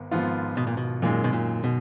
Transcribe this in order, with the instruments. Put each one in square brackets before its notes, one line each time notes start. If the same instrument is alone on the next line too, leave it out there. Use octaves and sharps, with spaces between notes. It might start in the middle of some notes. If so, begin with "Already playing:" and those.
Already playing: [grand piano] G#1 G#2 B3
G#1 G#2 F3 B3 F4
[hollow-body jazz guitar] B2
A#2
B2
[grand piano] F#2 D#3 G#3 [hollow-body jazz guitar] A#2
[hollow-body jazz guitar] B2
A#2
B2